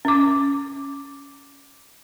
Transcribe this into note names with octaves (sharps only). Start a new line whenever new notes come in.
C#4 D6